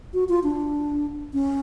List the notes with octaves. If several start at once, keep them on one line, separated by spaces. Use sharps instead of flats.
F#4
F4
D4
C#4